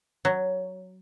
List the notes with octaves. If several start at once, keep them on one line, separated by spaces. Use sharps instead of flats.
F#3